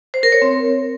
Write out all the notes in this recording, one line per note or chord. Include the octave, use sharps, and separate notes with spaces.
C5
A#4
C#5
C4